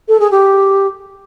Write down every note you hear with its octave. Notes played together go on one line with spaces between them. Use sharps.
A4
G#4
G4